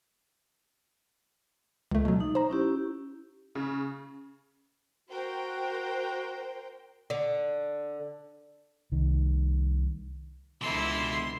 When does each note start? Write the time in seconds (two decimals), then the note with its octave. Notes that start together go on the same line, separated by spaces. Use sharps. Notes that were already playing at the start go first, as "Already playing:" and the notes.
1.91 C#2 A3
2.05 B2 F#3
2.20 D#4
2.35 C5 A#5
2.50 C#4 E4 G4
3.55 C#3
5.09 F#4 A#4 C5 G5
7.10 D3
8.92 C2 D#3
10.62 C#2 B2 D3 E3 E4 C6 E6